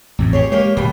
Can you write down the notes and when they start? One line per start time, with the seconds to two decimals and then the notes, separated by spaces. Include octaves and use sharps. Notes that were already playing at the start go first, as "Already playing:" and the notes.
0.19 A1 F2 A2
0.33 G4 G#4 C#5
0.52 G#3 A#3 G4 C#5
0.77 D1 B2 B3 G5